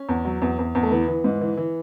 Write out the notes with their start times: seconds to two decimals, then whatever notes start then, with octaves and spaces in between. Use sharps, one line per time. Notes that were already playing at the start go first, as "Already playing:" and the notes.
Already playing: C#4
0.09 E2
0.25 F#3
0.42 E2
0.59 E2
0.75 E2
0.83 A3
0.91 E3 B3
1.08 E3
1.24 G#2
1.41 E3
1.57 E3